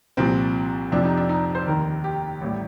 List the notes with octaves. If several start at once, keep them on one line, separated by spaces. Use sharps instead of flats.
C2 A#2 F3 C4
F1 F2 C3 F3 D4
D#4
D4
D#4
C5
F1 D#2 D#3 A#4
G4
A1 A2 G3